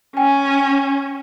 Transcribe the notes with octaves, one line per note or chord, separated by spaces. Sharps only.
C#4 G5 G#5